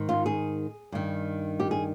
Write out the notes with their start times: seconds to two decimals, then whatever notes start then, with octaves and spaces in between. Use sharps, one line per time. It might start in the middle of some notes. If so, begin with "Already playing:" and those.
Already playing: G#2 D#3
0.09 F4
0.26 G#4
0.92 G2 D#3
1.60 G4
1.71 G#4